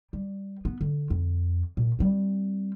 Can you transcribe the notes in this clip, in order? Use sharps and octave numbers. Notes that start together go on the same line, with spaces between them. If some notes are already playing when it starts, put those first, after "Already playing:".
G3
B3
D3
F2
A#2
G3 C4